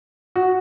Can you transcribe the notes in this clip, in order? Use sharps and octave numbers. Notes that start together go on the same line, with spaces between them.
F#4